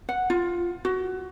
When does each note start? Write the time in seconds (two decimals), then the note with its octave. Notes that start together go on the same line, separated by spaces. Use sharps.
0.09 F#5
0.30 F4
0.85 F#4